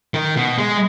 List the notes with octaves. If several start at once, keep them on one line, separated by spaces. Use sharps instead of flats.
D#3
B2
G#3